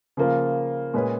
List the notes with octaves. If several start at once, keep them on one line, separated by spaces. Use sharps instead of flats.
C#3 F3 A#3 F4 A#4
A#2 G#3 C#4 G#4 B4